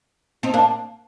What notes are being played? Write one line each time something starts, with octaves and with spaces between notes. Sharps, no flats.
C4 D#4
A#3 D4